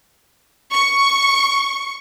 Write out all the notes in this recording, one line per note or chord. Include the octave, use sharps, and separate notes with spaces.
C#6